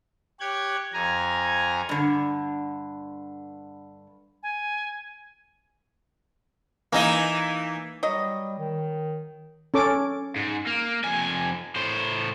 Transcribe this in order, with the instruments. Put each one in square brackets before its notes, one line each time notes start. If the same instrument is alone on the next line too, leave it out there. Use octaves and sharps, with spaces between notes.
[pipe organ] G4 C#5 F#6 G#6
F2 G#5 A#5
[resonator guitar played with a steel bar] G2 D3
[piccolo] G#5
[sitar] E3 D#4 D#5 [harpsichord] A#3
[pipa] F#3 D#5 [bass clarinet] G3
[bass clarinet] D#3
[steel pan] C#4 A4 D6
[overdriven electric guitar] G#2
A#3
F2 G#5
A2 C5